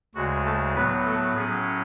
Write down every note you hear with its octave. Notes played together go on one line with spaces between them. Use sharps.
D2 C#3 G#3 F#4
A3 A4
A2 F#3 B3 B4
A3 A4
A2 F#3 C#4 G#4